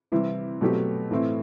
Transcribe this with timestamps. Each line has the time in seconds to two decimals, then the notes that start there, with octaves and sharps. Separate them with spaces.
0.12 C3 E3 G3 C4 E4
0.61 B2 F#3 A3 C4 G4
1.11 A2 E3 A3 C4 E4